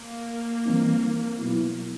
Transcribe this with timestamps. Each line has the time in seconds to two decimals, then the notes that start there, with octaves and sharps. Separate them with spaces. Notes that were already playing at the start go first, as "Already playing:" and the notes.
Already playing: A#3
0.65 E3 G3 C4 D#4
1.39 B2 F#3 B3 E4